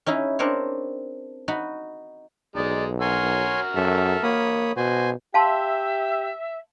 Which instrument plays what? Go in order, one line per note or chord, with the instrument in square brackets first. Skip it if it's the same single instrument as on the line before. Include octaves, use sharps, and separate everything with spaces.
[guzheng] C#4 D#4 E4 G#4
C4 D4 A#4 C5 C#5
D#4 F#4 B5
[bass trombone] B1 [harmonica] G#3 D#4 [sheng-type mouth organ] D5
[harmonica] F#4 A#4 F6 [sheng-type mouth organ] C#5 G#5 C6
[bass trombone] F#2 [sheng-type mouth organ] A4 E5
[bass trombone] A#3 [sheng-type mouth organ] C#5 B5 D#6
[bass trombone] B2 [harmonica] F#4 [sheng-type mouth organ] C5 G#5
[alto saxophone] G4 [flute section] E5 [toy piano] F5 A5 C6